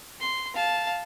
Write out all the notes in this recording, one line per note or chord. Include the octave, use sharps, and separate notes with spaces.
C6
F5 A5